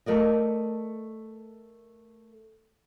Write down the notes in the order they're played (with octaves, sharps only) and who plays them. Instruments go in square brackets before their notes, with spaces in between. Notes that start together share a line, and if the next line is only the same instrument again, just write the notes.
[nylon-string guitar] A3 A#4 D5 D#5